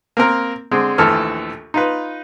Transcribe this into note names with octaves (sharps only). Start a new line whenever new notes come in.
A#3 C4 A#4
D3 G#3 C4
A#1 D#2 E3 A3 A4 F6
D#4 F4 B4